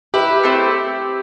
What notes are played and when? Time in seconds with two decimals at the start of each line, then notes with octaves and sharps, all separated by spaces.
0.14 E4 G4 B4 E5
0.43 A3 C4 E4